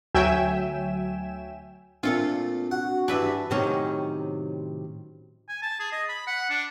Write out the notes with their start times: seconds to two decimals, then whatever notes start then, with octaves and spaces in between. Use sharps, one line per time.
0.15 D2 F#3 E5 G5 G#5 E7
2.03 A#2 A3 C4 D4 F4 A4 F5
2.71 F#4 F#5
3.08 G2 E3 D4 B4 E5
3.51 A2 C3 D#3 F#3 C#4 D#4
5.49 G#5
5.62 A5
5.80 G#4
5.92 D#5
6.09 B5
6.27 F#5
6.50 D4